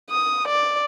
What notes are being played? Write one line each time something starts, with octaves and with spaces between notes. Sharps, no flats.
D#6
D5